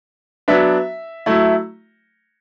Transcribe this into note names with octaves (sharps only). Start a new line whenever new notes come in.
F#3 B3 D4 E5
F#3 A3 E4